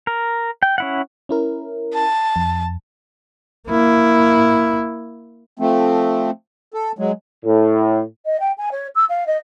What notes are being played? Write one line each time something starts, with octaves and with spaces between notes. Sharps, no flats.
A#4
G5
C#4 E4 F#5
C#4 E4 A#4
A5
F2
A#3 E4
F3 A3 C4
A4
F#3 G#3
A2
D#5
G5
G#5
C#5
E6
F5
D#5